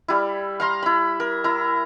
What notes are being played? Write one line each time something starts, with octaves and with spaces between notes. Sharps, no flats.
G3 E4
F5 A#5 C6
E4 B5
A#4
E4 A#5